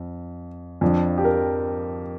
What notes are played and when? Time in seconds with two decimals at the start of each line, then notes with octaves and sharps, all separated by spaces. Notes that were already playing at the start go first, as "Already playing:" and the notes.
Already playing: F2
0.81 F2 F3 D4
1.18 G4
1.25 A#4